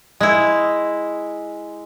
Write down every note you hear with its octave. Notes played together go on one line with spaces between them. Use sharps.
G#3 E4